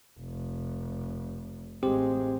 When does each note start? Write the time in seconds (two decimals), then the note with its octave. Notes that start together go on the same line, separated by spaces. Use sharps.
0.19 F1
1.83 A1 G#3 C4 G4 C5